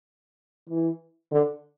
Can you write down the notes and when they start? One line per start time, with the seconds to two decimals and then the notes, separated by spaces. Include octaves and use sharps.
0.69 E3
1.31 D3